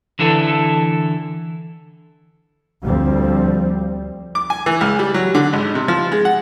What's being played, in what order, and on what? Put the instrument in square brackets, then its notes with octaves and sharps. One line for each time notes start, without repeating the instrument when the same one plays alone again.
[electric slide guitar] D3 E3 E4 A4
[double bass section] D2 F3 G3 C4
[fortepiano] D6
G#5
E3
C#2
G3
F#3
D3
G#1
C3
F3
G#3
F#5